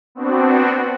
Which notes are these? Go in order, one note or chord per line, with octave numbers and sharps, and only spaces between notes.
B3 C4 D4 F#4